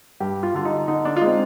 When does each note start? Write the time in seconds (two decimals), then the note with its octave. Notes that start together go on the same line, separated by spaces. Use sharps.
0.20 G2 G4
0.43 F4
0.54 D3 G3 F4
0.65 D#4
0.88 D3 D#4
1.05 D4
1.16 F4
1.21 G#3 C4 D#4